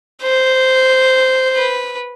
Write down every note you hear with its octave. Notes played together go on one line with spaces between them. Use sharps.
C5
B4